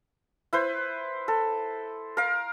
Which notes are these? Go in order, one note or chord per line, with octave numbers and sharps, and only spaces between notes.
E4 B4 C5
A4
A#4 F5